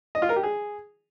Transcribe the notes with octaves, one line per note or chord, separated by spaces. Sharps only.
D#5
F4
A#4
G4
G#4